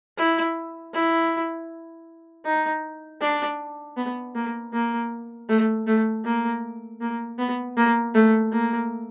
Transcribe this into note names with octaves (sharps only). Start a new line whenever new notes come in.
E4
E4
D#4
D4
B3
A#3
A#3
A3
A3
A#3
A#3
B3
A#3
A3
A#3